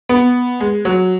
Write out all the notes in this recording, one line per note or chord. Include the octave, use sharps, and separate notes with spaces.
B3
G#3
F#3